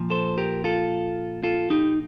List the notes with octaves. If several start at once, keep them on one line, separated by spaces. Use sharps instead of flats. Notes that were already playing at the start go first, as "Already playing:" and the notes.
Already playing: A#2 F3
A4 C5
G4 A#4
F4 A4
F4 A4
D#4 G4